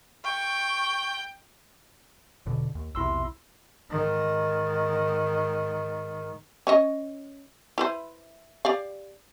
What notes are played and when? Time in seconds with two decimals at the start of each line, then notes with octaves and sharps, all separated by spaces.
0.24 G5 C#6
2.46 E1 B2 D3
2.75 D#2
2.95 B1 E2 C3 E4 C6 E6
3.90 G#2 D#3
6.67 C#4 C#5 D#5
7.78 E4 B4 C5
8.65 G4 D5 F5